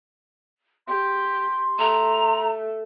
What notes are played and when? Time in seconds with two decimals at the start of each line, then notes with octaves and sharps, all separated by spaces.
0.88 G4 C6
1.79 A3 A#5